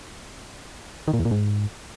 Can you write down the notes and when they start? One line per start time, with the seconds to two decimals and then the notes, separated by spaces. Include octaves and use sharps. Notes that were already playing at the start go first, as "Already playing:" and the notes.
1.08 D#3
1.13 A#2
1.19 E2
1.25 A#2
1.31 G#2